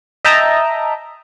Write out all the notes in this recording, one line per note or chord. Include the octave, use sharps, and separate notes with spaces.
D#5 E5 G5 A5 A#5